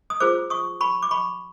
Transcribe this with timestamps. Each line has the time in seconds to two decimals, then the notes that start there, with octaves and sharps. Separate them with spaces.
0.10 D#6
0.20 F4 G#4 C5 D6 E6
0.50 C#6 D#6
0.81 B5 C#6
1.03 D6
1.11 B5 C#6